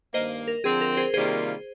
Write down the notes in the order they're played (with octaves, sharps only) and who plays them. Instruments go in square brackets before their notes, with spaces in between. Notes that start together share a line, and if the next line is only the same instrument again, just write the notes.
[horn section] G2 D#3 A#3 [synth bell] C5 D#5
[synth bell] A#4
[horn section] D3 F3 C4 [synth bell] G#4
[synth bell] A#4
G#4 C5
[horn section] C3 D#3 G3 A#3 F4 [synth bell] G#4 C5